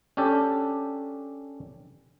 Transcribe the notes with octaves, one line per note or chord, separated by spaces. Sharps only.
C#4 D4 G4 A4